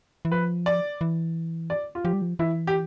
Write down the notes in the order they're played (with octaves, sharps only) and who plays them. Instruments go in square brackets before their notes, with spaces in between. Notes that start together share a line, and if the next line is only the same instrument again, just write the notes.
[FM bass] E3
[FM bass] F3 [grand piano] B4
[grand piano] D5
[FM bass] E3
[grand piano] D5
F4
[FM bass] F3 [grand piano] G4
[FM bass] G3
F3
[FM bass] E3 [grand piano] E4
[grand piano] G4